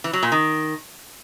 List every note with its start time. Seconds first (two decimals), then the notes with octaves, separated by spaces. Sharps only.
0.04 E3
0.13 F#3
0.23 A#2
0.32 D#3